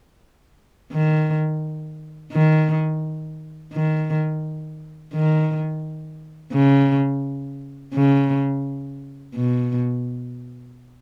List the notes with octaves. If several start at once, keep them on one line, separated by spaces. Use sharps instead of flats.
D#3
D#3
D#3
D#3
C#3
C#3
B2